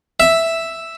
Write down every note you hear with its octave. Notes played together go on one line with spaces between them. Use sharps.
E5